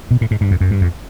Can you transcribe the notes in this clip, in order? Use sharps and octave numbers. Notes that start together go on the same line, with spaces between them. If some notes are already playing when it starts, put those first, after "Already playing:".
B2
A2
G#2
G2
F2
F#2
G2
F2